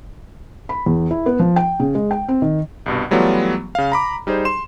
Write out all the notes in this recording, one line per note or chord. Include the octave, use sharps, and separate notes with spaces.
B5
E2
E4
B3
F3
G5
C#3
G#3
G5
C4
D#3
C2 G2 B2
E3 F#3 G3 A3 B3 F4
C#3 F5
A#5 B5 D6
G3 D#4 G#4 C5
C6 E7